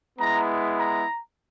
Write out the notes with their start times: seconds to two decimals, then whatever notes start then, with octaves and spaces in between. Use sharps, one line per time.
0.19 G#3 B3 E4 A#5
0.79 A#5